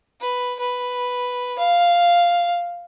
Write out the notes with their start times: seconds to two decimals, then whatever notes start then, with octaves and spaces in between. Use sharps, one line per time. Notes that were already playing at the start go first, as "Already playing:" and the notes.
0.21 B4
0.59 B4
1.59 F5